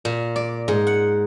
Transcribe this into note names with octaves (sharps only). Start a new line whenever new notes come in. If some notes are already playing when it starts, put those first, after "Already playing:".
A#2
D5
G#2
F#5